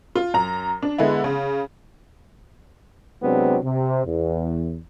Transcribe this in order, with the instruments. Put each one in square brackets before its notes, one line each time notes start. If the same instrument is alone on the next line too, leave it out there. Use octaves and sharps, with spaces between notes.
[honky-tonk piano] F4
F#2 A#5
D4
D3 G#3 B3 E4
C#3
[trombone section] C3 F#3 G#3 B3 C4 D4
C3
E2